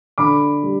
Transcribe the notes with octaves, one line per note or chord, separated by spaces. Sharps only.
D3 B5 D6
G3